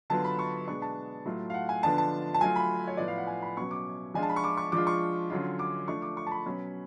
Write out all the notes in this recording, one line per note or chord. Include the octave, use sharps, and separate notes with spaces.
D3 F#3 B3 F4 A5
B5
C#6
B2 G#3 B3 D4 C#6
A5
A2 F#3 A3 F4
F5
F#5
G#5
D3 F3 B3 D4 A5
A5
A5
F#3 A3 F4 G#5
B5
C#5
A2 F3 B3 D5
F5
F#5
G#5
B5
B2 F#3 C#4 C#6
D6
F3 G#3 D4 F4 G#5
A5
B5
C#6
D6
C#6
F3 G#3 D4 F4 D6
C#6
D3 F#3 C#4 F4
D6
F3 A3 D4 C#6
D6
C#6
A5
B5
B2 F#3 C#4